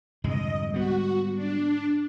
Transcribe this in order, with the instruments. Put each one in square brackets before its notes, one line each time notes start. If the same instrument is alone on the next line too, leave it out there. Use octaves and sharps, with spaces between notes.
[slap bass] C2 F2 G#3 [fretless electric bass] G#2 D3 [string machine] D#5
[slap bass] G3 B3 [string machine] F#4
[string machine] D4